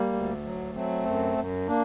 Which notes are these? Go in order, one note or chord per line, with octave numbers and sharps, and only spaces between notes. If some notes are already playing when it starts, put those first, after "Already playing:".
Already playing: G3 A#3
D2
F#3
F#3 A3 C4
F#2
F#2
A#3 D4